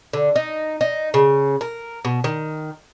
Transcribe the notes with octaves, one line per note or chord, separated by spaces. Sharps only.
D3
D#4
D#4
C#3
A#4
B2
D#3